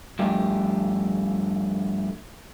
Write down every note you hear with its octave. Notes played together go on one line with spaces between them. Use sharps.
G2 F3 A3 G4